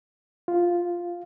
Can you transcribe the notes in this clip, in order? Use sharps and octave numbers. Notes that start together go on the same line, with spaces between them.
F4